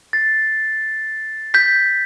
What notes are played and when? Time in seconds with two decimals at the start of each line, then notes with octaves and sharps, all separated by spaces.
0.13 A6 C7
1.54 G6 B6